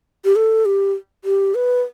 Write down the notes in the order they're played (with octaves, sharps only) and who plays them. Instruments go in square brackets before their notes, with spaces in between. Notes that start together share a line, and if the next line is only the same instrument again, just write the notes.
[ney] G4
A4
G4
G4
B4